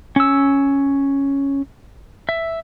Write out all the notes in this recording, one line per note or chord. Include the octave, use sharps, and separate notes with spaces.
C#4 E6
E5